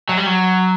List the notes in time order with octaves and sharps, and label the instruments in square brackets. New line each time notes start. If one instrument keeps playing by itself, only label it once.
[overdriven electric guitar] F#3
G3
F#3